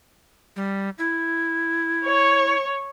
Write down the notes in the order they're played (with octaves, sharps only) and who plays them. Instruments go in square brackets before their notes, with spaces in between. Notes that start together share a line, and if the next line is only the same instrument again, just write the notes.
[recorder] G3
E4
[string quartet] C#5